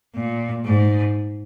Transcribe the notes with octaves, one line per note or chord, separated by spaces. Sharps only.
A#2
G#2